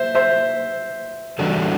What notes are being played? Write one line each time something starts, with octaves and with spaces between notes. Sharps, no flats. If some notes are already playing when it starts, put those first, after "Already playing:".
Already playing: C5 E5
C5 E5
E3 G3 D4 F#4 A4